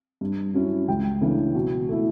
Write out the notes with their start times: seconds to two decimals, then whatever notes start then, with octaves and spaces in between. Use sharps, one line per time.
0.21 G2
0.54 F#3 C#4 E4
0.88 C#2 G5
1.21 C#3 E3 A3 D4
1.55 B2
1.89 A3 E4